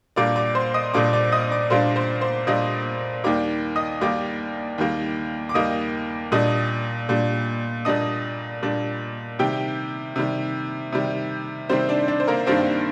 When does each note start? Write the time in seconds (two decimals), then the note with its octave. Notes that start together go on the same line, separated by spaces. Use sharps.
0.16 A#2 G3 A#3 D4 D5 D6
0.36 D5 D6
0.55 C5 C6
0.74 D#5 D#6
0.94 A#2 G3 A#3 D4 D5 D6
1.13 D5 D6
1.32 D#5 D#6
1.51 D5 D6
1.70 A#2 G3 A#3 D4 C5 C6
1.96 C5 C6
2.21 C5 C6
2.47 A#2 G3 A#3 D4 D#5 D#6
3.24 D#2 D#3 G3 A#3 D5 D6
3.76 D#5 D#6
4.01 D#2 D#3 G3 A#3 D5 D6
4.78 D#2 D#3 G3 A#3
5.49 D6
5.54 D#2 D#3 G3 A#3 D#5 D#6
6.32 A#2 G3 D4 D#5 D#6
7.09 A#2 G3 D4
7.85 A#2 G3 D4 D#5 D#6
8.63 A#2 G3 D4
9.39 C3 D#3 G3 G4 G5
10.16 C3 D#3 G3
10.92 C3 D#3 G3
11.69 C3 D#3 G3 C4 C5
11.89 D4 D5
12.08 D4 D5
12.20 C5
12.27 A#3 A#4
12.47 G2 D#3 G3 A#3 C4 D4 C5